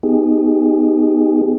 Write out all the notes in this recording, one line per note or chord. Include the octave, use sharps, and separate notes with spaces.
B3 D#4 G4 G#4